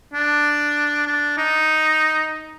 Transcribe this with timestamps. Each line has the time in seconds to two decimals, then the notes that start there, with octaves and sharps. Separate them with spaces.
0.14 D4
1.07 D4
1.37 D#4